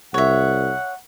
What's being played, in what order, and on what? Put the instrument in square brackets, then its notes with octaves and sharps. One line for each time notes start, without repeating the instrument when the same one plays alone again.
[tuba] C2 [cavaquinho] C#5 E5 [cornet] F#5